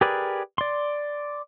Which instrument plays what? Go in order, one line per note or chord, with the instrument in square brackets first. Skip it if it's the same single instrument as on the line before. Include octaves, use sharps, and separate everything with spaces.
[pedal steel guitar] G4 G#4 A#4 B4 D5
D5 C6